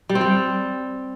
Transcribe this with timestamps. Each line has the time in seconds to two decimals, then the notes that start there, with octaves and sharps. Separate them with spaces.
0.09 G3
0.15 C4
0.21 G3